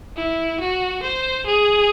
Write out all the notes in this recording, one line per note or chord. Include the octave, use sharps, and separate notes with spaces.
E4
F#4
C5
G#4